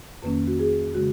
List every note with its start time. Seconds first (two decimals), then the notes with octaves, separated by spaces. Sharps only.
0.23 F2 D#3 A#3 C#4 B4
0.47 F#4
0.59 G#4
0.94 C#3 G#3 F#4